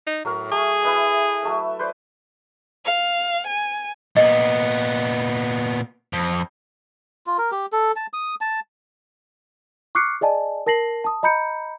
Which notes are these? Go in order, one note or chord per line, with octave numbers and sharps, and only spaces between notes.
D#4
A2 F#3 A#4
A3 G#4
E4 B4 D#5
F#3 A3 E5
B4 C5 D5
F5
G#5
A#2 B3 D#5
F2
F4
A#4
G4
A4
A5
D#6
A5
C#6 D6 F6 F#6 C7 C#7
G#4 D5 D#5 G#5 A5
A#4 A5 A#6 C7 F#7
A5 D#6
D#5 A#5 B5 G6 C#7